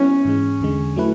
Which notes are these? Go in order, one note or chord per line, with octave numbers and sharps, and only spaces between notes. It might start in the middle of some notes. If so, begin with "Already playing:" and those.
Already playing: F#3 B3 C#4 E4
G#2 E3 G#3
E2 D3 G#3
F#3 A3 E4 B4